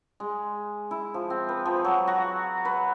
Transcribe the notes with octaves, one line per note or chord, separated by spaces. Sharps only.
G#3
E4
F3
C4
B4
F3
F#3
F#4
B4